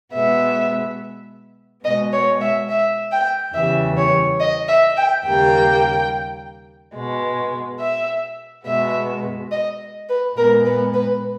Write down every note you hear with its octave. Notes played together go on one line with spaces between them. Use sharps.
B2 G#3 B3 E5
B2 G#3 B3 D#5
C#5
E5
E5
G5
E2 C#3 E3 G3 E5
C#5
D#5
E5
G5
D#2 C#3 G3 A#3 G5
B2 G#3 B3
E5
B2 G#3 B3 E5
D#5
B4
A#2 G#3 B3 A#4
B4
B4